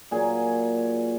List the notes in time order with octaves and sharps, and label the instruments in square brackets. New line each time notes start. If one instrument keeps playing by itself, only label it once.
[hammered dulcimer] A#2 F#3 G#4 G#5